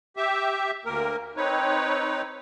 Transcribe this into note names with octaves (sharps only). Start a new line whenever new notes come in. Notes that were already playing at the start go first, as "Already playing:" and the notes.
G4 E5
D2 A#3 A#4
C4 D#4 B4 C#5